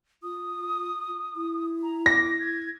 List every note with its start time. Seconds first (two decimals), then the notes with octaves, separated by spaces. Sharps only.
0.23 F4 D#6
1.36 E4
1.83 A#5
2.06 D6 A#6
2.39 G#6